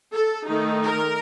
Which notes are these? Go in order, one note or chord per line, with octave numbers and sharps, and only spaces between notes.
A4
D#3 A3 D#4
A#4